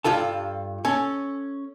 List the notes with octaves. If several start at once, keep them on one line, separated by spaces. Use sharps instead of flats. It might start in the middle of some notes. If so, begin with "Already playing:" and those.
G2 F4 A4 A5
C#4 A4